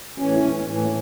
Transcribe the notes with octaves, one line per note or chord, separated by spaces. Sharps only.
A2 E3 C#4
A2 E3